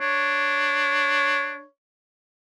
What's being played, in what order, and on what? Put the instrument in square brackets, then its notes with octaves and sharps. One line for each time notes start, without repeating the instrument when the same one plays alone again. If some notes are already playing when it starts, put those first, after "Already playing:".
[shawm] D4 [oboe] C#5